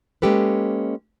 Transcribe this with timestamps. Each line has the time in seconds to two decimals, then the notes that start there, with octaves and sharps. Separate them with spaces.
0.22 G#3 A#3 C#4 G4 A4 B4